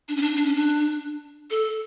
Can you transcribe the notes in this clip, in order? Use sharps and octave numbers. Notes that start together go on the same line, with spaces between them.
D4
C#4
D4
D4
C#4
D4
A4